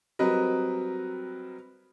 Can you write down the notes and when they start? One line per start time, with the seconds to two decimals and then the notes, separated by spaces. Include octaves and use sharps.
0.19 F#3 G3 C4 A#4 B4 D#5